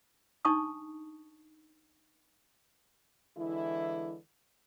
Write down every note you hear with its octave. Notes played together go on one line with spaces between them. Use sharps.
D4 D#4 A5 C#6 D#6
D3 E3 G#3 E4